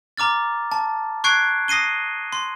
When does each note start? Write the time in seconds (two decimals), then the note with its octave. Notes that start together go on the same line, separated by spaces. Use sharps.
0.17 A#5 D6 F6 A6
0.72 A5
1.24 C#6 F#6 G#6 C7 D7
1.68 D#6 A#6 C7 D#7 G7
2.33 C6